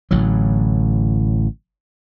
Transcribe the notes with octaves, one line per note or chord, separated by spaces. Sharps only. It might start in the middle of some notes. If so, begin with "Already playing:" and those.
A1 A2 D3 F#3